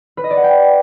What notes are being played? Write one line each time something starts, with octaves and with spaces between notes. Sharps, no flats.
B4
D#5
D5
F#5
G5